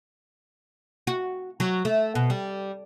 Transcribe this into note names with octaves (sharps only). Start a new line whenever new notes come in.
F#4
F#3
A3
B2
G3